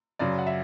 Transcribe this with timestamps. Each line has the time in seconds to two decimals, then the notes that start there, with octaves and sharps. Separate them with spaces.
0.19 F#2 C#3 F#3 D5
0.39 F#5
0.47 E5